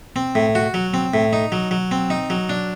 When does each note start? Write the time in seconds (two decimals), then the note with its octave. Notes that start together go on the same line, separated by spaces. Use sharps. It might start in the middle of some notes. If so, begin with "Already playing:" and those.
0.16 C4
0.35 A2
0.55 F#4
0.74 F#3
0.94 C4
1.14 A2
1.33 D#4
1.52 F#3
1.71 F#3
1.91 C4
2.10 D#4
2.30 F#3
2.49 D4